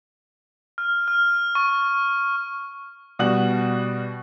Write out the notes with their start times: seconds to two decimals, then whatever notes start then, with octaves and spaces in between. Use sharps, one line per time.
0.78 F6
1.08 F6
1.55 C#6
3.19 B2 G3 F#4 F#7